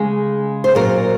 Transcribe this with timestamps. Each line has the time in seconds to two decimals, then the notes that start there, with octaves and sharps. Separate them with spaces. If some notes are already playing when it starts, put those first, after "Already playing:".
Already playing: C#3 G#3
0.64 C5
0.75 A#2 F#3 A#4